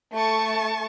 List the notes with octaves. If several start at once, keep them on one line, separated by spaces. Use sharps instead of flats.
A3 A5 C#6